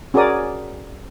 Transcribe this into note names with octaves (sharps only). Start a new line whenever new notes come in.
C#4 F#4 G#4 A#4 D5 D#6